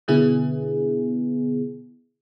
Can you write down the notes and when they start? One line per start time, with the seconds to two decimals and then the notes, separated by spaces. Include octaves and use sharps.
0.08 B2 D3 B3 E4 G#4